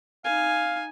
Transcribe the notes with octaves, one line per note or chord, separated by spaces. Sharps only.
D#4 F5 G#5